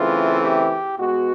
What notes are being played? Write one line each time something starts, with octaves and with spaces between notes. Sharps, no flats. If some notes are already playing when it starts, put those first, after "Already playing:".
Already playing: C#3 E3 A3 C4 F4
G4
B2 G#3 B3 F#4